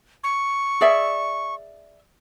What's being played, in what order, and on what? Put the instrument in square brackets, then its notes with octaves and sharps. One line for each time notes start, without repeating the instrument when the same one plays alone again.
[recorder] C#6
[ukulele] G#4 D5 E5